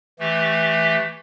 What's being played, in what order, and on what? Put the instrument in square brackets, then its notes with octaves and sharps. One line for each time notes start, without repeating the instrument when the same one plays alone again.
[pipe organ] E3 A3 G4